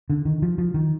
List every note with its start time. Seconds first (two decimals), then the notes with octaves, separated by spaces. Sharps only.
0.10 D3
0.25 D#3
0.42 F3
0.58 F3
0.74 D#3